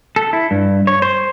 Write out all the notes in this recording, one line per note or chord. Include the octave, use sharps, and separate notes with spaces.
A4
E4
G2
C#5
C5